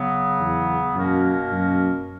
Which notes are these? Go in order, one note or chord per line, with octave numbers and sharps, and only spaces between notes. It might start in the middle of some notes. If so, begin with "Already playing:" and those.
Already playing: C#3 F#3 B3
E2
F#2 B2 A#3 C#4 F#4 A#4
F#2